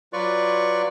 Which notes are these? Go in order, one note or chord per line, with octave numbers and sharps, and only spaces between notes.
F#3 F4 B4 D5 C#6